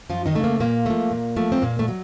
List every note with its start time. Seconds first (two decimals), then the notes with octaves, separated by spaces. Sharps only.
0.09 F#2 F3 F4
0.26 D#3 D#4
0.35 C#3 A3
0.44 A#3
0.60 A#2 A#3
0.86 F3 A3
1.11 A#2
1.36 F3 A3
1.52 C4
1.62 A#2 A#3
1.79 A3
1.88 F#3